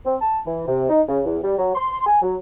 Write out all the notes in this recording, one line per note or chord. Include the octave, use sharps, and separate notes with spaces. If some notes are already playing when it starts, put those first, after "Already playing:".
C4
A5
E3
C3
D#4
C#3
E2
G3
F#3
C6
G#5
F#3